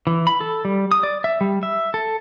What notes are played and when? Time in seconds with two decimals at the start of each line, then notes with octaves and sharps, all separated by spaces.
0.07 E3
0.27 B5
0.41 A4
0.65 G3
0.92 D#6
1.03 D5
1.24 E5
1.41 G3
1.63 E5
1.94 A4